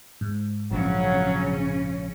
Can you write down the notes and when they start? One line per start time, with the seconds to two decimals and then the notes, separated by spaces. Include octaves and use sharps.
0.21 G#2
0.71 A#1 C#3 F#3 C#4